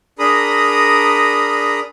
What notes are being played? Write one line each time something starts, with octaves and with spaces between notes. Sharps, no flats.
D4 G#4 A#4 A#5 B5 D#6